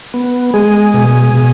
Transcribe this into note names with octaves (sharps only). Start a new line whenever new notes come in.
B3
G#3 G#4
B2
B2